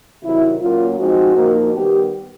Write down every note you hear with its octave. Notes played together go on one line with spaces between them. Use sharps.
C3 D#3 F#3 E4
A#2 F#3 A#3 C#4 F4
F3 G#3 C4 D#4 F#4
A#2 F3 A#3 D#4
D#3 G3 B3 G4